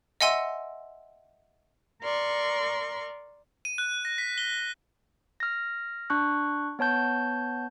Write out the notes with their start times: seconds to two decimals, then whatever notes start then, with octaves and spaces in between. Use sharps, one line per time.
0.21 D#5 E5 F#5 G#5 C6 E6
2.02 A#4 D5 C6 C#6
3.65 D#7
3.78 F#6
4.05 A#6
4.18 B6
4.38 G7
5.40 F6 A#6
6.10 D4 C#6 F#6
6.79 B3 C#5 A5 G6